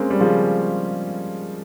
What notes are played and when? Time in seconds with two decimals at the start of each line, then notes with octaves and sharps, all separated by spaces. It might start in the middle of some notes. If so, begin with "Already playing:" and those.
Already playing: G#3 A#3 C4 C#4
0.10 G3
0.20 C#3 F3